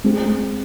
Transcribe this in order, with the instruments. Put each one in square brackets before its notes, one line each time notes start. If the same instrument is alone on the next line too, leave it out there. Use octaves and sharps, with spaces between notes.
[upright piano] G#3 C4 G#4